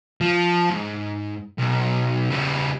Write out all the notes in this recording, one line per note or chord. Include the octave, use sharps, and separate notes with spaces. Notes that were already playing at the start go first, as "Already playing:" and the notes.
F3
G#2
B1
C#3 G3